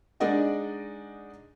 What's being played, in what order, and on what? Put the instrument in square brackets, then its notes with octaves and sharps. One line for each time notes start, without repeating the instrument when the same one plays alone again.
[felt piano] G#3 D4 D#4 D5 D#5 F#5